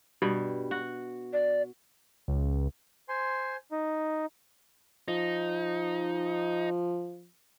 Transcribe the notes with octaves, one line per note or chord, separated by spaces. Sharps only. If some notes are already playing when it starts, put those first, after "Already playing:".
G2 B2 G3
F#4
D5
C#2
C5 G#5 C6
D#4
F3 D#4